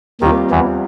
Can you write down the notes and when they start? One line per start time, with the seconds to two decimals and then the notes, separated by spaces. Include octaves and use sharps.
0.21 D#2 D#3 G3 C4 F4
0.51 E2 E3